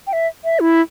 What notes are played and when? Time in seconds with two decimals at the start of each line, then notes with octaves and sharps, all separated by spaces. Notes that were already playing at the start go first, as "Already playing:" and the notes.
0.07 G5
0.13 E5
0.44 E5
0.60 E4